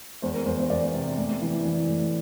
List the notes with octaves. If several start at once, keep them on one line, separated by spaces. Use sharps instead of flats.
E2 C5
A#4
E2 C5
C5
E2 D5
C3
A2
E3
E3
A2